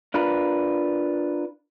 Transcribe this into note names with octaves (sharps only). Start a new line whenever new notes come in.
D4 F4 A#4 B4